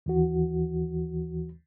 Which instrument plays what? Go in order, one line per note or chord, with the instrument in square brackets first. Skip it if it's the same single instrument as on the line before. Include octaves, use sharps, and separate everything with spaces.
[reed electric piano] D#2 E3 F#4